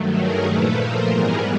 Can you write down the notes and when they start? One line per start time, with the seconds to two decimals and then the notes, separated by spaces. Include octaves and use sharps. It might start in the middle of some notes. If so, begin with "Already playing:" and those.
Already playing: G2 D#3 F#3 A3
0.15 G#4 A#4
0.46 A#2 F3 A3 A4 B4
0.77 A#4 C5
1.09 G#2 E3 G3 B3 G#4 A#4